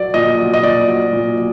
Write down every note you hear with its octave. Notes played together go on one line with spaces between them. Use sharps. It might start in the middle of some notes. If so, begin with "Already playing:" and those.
Already playing: F#3 D5
A#2 D#5
F#3
D#5
A#2 D5
F#3
A#2
F#3